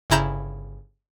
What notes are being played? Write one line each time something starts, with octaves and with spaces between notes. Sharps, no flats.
G1 C#3 E4 A#5 G6 E7